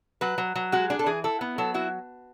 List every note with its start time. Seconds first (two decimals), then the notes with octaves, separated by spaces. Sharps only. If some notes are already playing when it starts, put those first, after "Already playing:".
0.21 F#3 B4
0.38 F#3
0.55 F#3
0.72 G#3 F#4
0.90 D4 G#4
0.99 A4
1.06 E3 G#4
1.24 E4 A4
1.41 B3
1.58 F#3 A4
1.74 E4 F#4